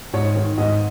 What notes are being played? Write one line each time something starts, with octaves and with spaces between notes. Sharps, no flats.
G#2 C#5
D#3
G#2 D#5